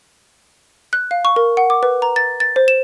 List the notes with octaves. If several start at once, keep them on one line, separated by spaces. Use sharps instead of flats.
F#6
F5
C#6
A#4
F#5
D6
B4
A#5
A6
A6
C5
E7